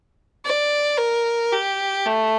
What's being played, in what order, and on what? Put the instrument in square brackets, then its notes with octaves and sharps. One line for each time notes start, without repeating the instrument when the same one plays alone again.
[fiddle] D5
A#4
G4
A3